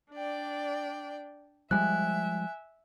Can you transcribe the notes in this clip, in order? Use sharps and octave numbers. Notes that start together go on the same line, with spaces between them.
D4 D5 G5
F3 G3 G#3 E5 G#5 F#6